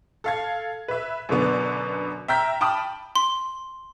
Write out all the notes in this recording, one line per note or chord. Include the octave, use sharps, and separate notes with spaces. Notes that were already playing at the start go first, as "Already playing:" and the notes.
A4 F5 G#6
B4 E5
F#2 B2 D3 B3 D5
E5 G5 A#5 F6 G6 B6
G5 A5 B5 D#6 F6
C6